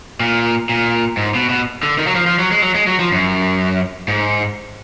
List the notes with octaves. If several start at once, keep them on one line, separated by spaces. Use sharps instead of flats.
A#2
A#2
G#2
B2
B2
D3
D#3
F#3
F3
F3
F#3
G#3
F#3
G#3
F#3
F3
F#2
G#2